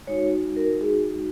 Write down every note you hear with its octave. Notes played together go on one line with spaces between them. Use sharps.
G#3 D#4 F#4 C#5
A#4
G#4